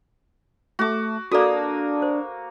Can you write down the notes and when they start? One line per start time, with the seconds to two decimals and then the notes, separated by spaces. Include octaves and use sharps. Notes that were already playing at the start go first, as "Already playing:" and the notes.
0.79 A3 F#4 D6
1.31 A#3 D4 F#4 A4 D5 D#6
2.02 C5